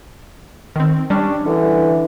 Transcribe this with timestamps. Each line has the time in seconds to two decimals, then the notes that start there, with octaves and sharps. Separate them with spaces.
0.76 D#3 C4
1.10 G3 C#4 D4
1.46 D3 E3